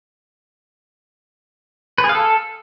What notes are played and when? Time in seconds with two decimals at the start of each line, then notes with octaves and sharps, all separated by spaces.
1.98 B4
2.04 G#4
2.09 F5
2.15 A4